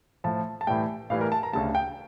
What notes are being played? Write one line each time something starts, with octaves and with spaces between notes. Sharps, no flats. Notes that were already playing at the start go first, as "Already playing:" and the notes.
A2 F3 A5
A5
A2 E3 G3 G5
A2 E3 G3 F5
A#4
A5
A#5
D2 C#3 G3 A5
G5